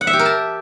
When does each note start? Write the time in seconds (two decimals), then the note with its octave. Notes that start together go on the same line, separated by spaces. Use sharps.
0.01 F#5
0.07 E5
0.13 G4
0.19 A#4
0.26 A5